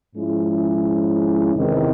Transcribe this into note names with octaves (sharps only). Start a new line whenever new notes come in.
G#2 F3 G#3 C#4 E4
E2 C3 D#3